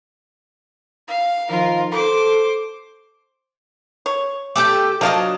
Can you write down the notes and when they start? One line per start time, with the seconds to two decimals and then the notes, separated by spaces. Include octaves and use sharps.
1.08 F5
1.50 D#3 F3 F4 A#4
1.92 A4 C5 D6
4.06 C#5
4.56 A3 G4 A4 D6 G6
5.01 F3 F#3 D4 D#5 F5 A5